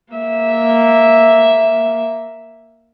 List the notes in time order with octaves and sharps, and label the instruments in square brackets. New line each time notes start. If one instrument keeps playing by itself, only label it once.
[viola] A#3 E5